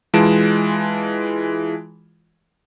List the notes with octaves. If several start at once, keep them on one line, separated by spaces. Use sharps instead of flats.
E3 G#3 F4 A5 D7 E7